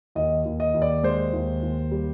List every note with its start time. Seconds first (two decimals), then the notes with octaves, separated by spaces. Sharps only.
0.15 D#2 D#5
0.45 D#2
0.60 D#5
0.74 D#2
0.82 D5
1.03 G#3 C5
1.33 D#2
1.63 D#2
1.91 G3